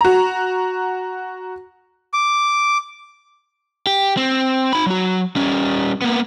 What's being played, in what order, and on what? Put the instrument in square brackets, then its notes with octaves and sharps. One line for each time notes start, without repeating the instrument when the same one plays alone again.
[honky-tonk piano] F#4 A#5
[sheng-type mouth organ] D6
[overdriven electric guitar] G4
C4
D#4 B5
F#3 F#4
G3 C#4
A#3 B3